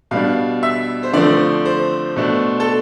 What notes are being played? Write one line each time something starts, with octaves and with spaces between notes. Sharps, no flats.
B2 G3 D4 F5
E5
C5
D3 F3 A3 C4 D5
C5
B2 A3 D4
A4